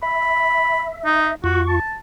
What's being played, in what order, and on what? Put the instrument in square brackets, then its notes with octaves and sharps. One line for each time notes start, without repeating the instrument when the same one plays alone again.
[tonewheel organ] E5 [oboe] B5
[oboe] D#4
[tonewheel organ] F2 F4 C#6 [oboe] F#4
[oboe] A5